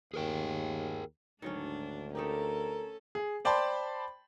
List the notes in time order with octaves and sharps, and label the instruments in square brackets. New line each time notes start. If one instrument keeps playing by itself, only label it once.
[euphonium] D#2 [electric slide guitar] G#4 A#4 G5
[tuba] D2 [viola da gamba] G#2 D4 [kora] D#3 F#3 C#4
[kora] A3 D#4 G4 [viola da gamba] C#4 A4 [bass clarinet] A#4
[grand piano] G#4
C5 D5 G5 A5 B5 C6